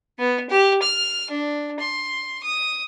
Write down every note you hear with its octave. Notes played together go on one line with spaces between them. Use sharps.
B3
G4
F6
D4
C6
D#6